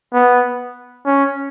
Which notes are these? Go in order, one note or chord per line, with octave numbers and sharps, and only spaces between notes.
B3
C#4